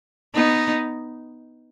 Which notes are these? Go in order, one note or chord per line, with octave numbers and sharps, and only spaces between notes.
B3 D#4